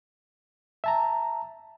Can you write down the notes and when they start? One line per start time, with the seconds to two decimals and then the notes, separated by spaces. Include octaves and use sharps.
0.84 E5 A5 A#5